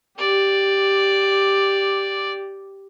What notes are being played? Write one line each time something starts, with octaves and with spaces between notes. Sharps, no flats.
G4 D5